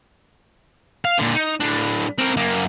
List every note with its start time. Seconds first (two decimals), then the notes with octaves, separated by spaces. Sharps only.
1.05 F5
1.19 A#2 D3
1.35 D#4
1.60 A2 D4
2.18 C4 A#4
2.37 F#2 A#3